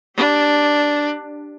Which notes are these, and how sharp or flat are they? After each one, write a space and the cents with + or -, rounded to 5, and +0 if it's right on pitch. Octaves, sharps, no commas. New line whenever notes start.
D4 +0 G4 +0